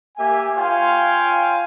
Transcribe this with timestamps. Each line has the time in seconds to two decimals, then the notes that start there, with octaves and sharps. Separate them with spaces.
0.18 A#3 G4 E5 G#5
0.57 F4 C#5 F5 G5 G#5 C6